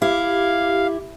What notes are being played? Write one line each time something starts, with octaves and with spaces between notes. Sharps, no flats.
E4 G4 F5